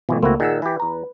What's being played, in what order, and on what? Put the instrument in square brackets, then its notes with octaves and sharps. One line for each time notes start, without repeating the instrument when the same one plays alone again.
[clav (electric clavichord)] G#1 E3 [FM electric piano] B2 F3 A3
[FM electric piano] C#2 A3 A#3 [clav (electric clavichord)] C4 E4 F#4
[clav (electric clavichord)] A#2 D#3 [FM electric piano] G#4 F#5 E6
[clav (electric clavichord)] E3 G4 [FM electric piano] B4
[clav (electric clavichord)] E2 A#5